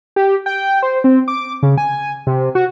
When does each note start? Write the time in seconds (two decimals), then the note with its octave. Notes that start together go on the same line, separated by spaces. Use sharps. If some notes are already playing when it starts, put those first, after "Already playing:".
0.16 G4
0.46 G5
0.83 C5
1.04 C4
1.28 D6
1.63 C#3
1.78 G#5
2.27 C3
2.55 F#4